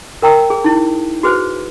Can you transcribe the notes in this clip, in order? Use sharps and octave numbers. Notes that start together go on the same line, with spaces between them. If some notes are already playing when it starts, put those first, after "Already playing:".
A#4 G5 A#5 E6
G#4
D#4 E4
F#4 G#4 B4 C5